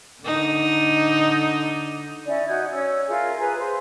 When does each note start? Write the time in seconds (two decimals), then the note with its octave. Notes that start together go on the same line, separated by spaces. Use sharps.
0.23 D3 D#4
2.26 C#4 E4 D5
2.48 D#4 F#4 G6 G#6
2.70 C#4 C#5 E6
3.07 E4 F4 G#4 A#4
3.38 G#4 B4 G#5 A#5
3.57 C5